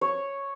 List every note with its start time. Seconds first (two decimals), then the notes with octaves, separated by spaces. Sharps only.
0.01 C#5